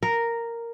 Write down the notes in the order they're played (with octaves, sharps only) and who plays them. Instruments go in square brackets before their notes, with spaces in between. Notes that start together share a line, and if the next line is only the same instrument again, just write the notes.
[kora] A#4